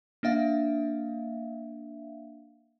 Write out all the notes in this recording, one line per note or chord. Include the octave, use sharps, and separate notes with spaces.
A#3 D4 E5 F5